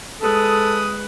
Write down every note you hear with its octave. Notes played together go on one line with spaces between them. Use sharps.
G#3 A4 B4 D#6